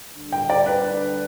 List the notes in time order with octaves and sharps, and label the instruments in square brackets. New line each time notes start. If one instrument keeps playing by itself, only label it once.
[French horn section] D2 D3 G3 D4
[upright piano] G5
D5
B4